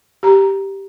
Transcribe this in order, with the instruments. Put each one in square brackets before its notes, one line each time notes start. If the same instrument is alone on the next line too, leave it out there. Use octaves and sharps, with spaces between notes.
[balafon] G4 A#5